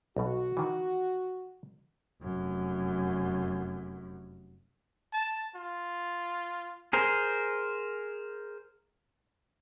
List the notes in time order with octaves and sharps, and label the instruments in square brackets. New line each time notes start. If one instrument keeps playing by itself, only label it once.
[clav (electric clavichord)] B1 B2 [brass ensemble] F#4
[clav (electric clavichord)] D#3 E3
[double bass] F1 F#2
[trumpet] A5
F4
[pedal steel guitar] G#4 A#4 C5